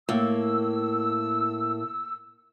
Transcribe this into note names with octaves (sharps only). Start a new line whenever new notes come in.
A2 A#3 E6